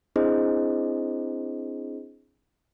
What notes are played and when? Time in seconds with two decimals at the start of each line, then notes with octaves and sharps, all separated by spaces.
0.16 C4 D4 E4 G#4 C5 D#5